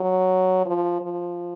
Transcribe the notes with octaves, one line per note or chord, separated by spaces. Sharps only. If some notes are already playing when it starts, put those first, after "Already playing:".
Already playing: F#3
F3
F3